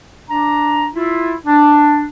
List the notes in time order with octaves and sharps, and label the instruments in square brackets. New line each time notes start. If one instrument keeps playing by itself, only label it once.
[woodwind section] D4 A#5
E4 F4
D4